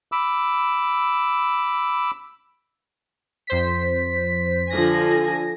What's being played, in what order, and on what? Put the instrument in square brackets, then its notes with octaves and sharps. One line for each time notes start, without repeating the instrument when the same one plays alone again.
[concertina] B5 D6 E6
[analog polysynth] F2 C5 B6
[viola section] D3 F3 G#5 [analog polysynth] A#6